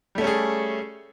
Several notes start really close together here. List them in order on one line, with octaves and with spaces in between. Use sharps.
G3 A3 C#4 A4 G#4